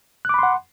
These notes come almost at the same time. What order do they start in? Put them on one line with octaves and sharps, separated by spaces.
F#6 D6 B5 C6 F#5